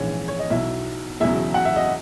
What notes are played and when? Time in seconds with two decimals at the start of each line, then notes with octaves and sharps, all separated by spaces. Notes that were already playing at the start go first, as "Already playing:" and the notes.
Already playing: A#1 G#2 E3 G#3 C#4 C#5
0.28 C#5
0.39 D#5
0.50 B1 B2 F#3 E4 E5
1.20 E1 E2 C#3 F#3 E4 E5
1.54 F#5
1.65 E5
1.76 D#5